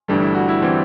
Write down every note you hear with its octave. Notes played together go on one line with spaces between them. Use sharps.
G1 G2 E3 G3 A3
E4
F#4
E4
E3 G3 C4